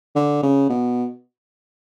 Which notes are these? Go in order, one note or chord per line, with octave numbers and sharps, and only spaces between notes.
D3
C#3
B2